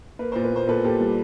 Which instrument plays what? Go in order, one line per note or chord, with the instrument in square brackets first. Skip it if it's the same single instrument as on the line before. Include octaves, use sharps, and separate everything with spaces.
[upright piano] A#3 B4
A#2 C5
B4
A#3 C5
A#2 A4 B4
A#2 G4 A4
G3